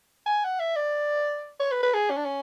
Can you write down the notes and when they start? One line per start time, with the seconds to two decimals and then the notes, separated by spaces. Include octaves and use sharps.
0.26 G#5
0.44 F#5
0.60 E5
0.76 D5
1.60 C#5
1.72 B4
1.83 B4
1.94 G#4
2.10 C#4
2.17 D4
2.25 C#4